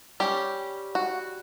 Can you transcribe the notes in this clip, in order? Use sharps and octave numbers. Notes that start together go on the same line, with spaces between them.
G3 C#4 G4
F#4